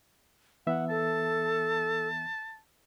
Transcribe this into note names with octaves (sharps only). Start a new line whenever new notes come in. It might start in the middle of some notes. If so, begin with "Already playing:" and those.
E3 B3 E5 F#5
A4 A5